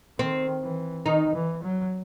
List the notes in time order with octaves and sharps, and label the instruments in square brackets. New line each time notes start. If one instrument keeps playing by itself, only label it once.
[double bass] D#3 [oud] C4
[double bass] E3
[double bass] D#3 [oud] D#4
[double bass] E3
F#3